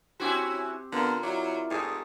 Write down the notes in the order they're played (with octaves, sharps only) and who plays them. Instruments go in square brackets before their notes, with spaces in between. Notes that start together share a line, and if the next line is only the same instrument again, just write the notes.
[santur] C4 G4 C5 [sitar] C#4 E4 F#4
[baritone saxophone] D3 [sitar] A#3 [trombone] B3 [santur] F4 A#4
[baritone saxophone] F#3 [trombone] E4 [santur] D5
[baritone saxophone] G#2 [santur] A3 G4 G#4